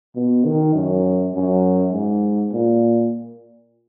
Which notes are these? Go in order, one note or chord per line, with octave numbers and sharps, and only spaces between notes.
B2
D#3
F#2
F#2
G#2
A#2